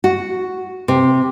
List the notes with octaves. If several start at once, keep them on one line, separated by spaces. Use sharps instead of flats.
F#4
C3